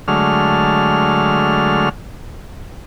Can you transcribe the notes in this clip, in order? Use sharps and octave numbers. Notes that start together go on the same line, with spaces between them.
D3 F#3 G#3 A3 F6